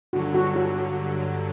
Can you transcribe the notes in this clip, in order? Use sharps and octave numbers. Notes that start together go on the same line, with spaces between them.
G2 D3 F#3 F#4
F#4
F#4